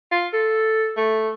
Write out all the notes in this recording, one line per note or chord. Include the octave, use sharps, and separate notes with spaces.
F4
A4
A3